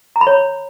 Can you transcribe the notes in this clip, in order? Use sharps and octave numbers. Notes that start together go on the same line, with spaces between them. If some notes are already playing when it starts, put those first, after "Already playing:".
A#5
B5
C#5